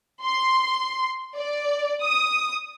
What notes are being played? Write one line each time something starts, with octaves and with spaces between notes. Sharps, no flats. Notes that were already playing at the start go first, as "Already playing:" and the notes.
C6
D5
D#6